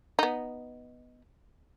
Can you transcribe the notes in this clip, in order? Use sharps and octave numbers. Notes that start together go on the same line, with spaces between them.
B3 D#4